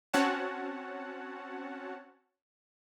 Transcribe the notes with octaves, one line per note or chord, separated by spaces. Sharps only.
C4 C#4 F#4 C#5 F#5 A5